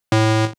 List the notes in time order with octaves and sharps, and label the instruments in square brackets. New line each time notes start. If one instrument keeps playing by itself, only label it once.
[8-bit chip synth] A2